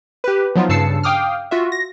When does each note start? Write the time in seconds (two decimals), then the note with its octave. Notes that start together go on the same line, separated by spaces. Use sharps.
0.24 G4 B4
0.56 F3 F#3 B3 D#4 F4
0.69 G2 C#3 A5 E6 C7 C#7
1.03 F5 G5 D6 D#6 F6
1.51 F4 F#4 E5
1.72 A#6